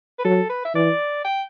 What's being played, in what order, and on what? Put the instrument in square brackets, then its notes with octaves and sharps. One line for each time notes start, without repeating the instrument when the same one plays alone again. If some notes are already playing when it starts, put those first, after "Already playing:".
[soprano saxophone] B4
[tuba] F#3 [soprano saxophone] A4
[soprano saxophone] B4
E5
[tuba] E3 [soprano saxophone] D5
[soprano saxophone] G5